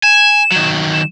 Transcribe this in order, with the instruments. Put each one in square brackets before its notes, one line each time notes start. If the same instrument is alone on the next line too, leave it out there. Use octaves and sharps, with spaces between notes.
[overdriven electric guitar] G#5 [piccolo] E7
[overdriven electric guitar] D#3 F#3
[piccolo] E7